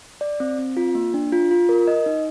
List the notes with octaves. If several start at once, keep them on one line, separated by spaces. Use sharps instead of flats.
D5
C4
C4
F4
A#3
D4
F4
F4
A#4
D#5
D#4